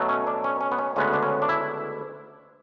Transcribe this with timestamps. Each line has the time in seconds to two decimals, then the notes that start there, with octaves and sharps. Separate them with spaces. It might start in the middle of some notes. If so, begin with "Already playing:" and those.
Already playing: B2 F#3 A3
0.09 C#4
0.27 D4
0.44 C#4
0.61 C#4
0.72 B3
0.79 C#4
0.96 D2 C#3 G#3 B3 C#4
1.13 D4
1.23 C#4
1.42 D4
1.49 E4